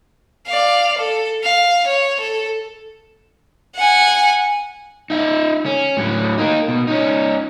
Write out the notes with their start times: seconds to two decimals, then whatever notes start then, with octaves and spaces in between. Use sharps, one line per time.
0.47 D5 F5
0.98 A4
1.43 F5
1.87 C#5
2.20 A4
3.76 F#5 G#5
5.10 D#4 E5
5.66 C#4
5.97 A2 F#3
6.38 A#3 D#4
6.68 B2
6.87 C#4 D#4